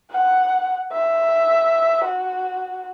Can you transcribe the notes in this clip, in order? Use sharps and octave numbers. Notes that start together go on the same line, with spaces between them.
F#5
E5
F#4